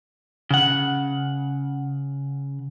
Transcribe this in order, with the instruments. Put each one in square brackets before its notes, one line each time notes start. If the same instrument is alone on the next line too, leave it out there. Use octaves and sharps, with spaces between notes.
[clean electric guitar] C#3 F#5